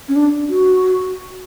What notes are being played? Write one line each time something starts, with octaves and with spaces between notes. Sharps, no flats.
C#4
D4
F#4